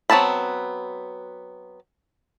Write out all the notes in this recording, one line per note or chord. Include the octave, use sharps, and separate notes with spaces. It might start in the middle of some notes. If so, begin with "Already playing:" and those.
F#3 B3 C4 A5 B5